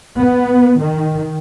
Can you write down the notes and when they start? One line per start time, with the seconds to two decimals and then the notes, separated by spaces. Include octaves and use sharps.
0.18 B3
0.81 D#3